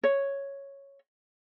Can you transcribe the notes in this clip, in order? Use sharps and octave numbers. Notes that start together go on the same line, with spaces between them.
C#5